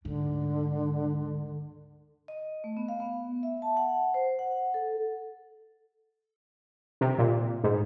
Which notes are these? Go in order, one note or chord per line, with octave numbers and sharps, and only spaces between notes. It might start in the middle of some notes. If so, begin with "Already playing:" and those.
D2 G#2 D3
D#5
A3
B3
F5
B3
E5
A5
F#5
C5
F#5
A4
C3
A#2
G#2